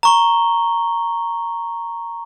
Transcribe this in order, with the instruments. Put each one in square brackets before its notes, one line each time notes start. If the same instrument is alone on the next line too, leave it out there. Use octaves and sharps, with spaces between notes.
[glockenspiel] A#5 C#6 G7